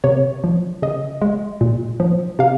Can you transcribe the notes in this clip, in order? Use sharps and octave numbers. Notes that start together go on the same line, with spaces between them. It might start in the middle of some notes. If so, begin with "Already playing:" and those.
C3 C#5
F3
C#3 D#5
G#3
A#2
F3
C3 F5